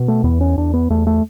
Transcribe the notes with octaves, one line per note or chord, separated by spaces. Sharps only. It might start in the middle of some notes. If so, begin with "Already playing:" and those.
Already playing: B2
A3
E2 B3
C#4
E2 D4
B3
E2 A3
A3